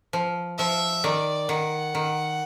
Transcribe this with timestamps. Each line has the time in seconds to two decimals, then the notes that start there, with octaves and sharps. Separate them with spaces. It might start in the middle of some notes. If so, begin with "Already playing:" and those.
0.13 F3
0.58 F3 E5
1.04 D#3 D5
1.49 D#3 F#5
1.95 D#3